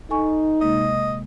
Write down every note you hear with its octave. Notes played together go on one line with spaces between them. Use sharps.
D#4 A4 G#5 C#6
C3 G#3 A#3 D#5